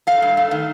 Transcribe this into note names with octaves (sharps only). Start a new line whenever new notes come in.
A3 F5
G2
A3
D#3